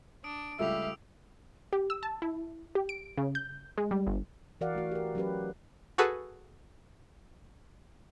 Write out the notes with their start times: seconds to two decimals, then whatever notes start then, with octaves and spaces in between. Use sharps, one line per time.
0.24 D4 D#6 D7
0.59 C#2 G3 A3 G4 E5 F5 E6 F7
1.73 G4
1.90 E6
2.03 A5
2.22 E4
2.75 G4
2.89 D7
3.18 C#3
3.35 G6
3.78 G#3
3.91 G3
4.07 G1
4.61 E3 F#4 A#4 D5 F5 F#5
4.75 A3 F#4
4.92 G4 A#4
5.15 F#3 C#4 G4 B4
5.98 F#4 G#4 A4 B4